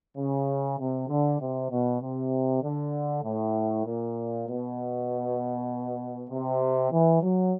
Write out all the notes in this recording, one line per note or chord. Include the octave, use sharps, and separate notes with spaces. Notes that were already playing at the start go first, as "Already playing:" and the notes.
C#3
C3
D3
C3
B2
C3
D3
A2
A#2
B2
C3
E3
F#3